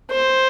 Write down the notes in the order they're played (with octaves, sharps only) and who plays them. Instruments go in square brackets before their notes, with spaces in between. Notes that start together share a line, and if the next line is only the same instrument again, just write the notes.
[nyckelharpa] C5